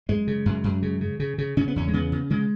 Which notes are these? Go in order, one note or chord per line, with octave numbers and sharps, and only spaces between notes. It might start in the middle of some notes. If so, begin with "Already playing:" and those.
F#2 G#3
C#3
F#2
F#2
C#3
C#3
C#3
C#3
C#3 C#4
B3
E2 C#4
G#3
C#3 B3
C#3
C#3 G#3